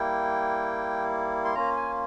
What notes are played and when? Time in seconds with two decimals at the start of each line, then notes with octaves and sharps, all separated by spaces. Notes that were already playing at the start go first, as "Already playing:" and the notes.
Already playing: G3 A#3 E4 G5
1.45 C6
1.55 A#3 C#4 F4 A#5
1.76 G#5